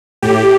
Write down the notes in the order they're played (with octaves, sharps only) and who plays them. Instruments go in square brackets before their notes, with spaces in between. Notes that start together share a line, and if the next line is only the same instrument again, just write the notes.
[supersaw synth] A2 G4